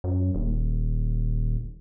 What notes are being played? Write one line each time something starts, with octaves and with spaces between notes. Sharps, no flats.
F#2
D#1